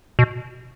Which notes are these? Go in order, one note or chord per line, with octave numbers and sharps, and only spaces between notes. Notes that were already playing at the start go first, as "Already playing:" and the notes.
B2